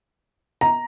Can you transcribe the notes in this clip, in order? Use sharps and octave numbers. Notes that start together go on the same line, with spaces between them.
A#5